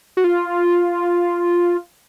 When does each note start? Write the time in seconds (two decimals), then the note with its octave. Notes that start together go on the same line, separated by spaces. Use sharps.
0.17 F#4
0.24 F4